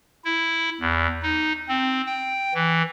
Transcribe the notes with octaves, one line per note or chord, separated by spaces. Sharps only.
E4
E2
D#4
C4
G5
E3